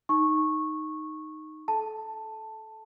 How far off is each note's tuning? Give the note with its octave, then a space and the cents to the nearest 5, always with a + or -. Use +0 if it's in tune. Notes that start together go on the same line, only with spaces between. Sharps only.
D#4 +0 C#6 -15
A4 -25 A5 +5